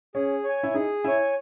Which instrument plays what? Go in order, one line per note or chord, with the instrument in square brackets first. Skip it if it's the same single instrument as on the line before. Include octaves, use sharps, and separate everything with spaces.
[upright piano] C#4 [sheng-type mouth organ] G#4
[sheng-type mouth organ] C#5
G#5
[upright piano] E4
[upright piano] D#4 [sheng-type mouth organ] G#4
[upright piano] E4 [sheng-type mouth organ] C#5 G#5